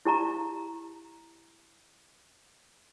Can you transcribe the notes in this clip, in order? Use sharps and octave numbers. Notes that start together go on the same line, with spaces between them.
E4 G4 A5 A#5